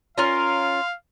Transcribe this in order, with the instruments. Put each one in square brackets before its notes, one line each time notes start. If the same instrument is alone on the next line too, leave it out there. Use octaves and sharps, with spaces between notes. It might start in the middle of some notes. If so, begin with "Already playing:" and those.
[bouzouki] C#4 F4 A#4 [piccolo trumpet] F5 [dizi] C6